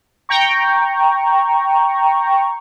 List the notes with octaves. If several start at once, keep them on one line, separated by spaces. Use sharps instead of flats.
G5 A#5 C#6